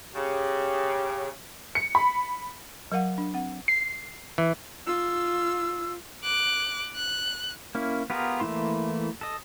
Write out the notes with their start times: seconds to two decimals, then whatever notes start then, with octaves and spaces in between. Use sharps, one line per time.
0.14 C#3 G4
1.75 C#7
1.95 B5
2.92 F#3 A#4 F5 F#5
3.18 D4
3.34 C4 F#5
3.68 C7
4.38 E3
4.87 F4 E6
6.24 D6 F#6
6.95 F#6
7.75 A#3 C#4 E4
8.10 B3 F4 G4 G#4 A#4
8.40 E3 A3 A#3 E4 C6
9.21 A4 D#5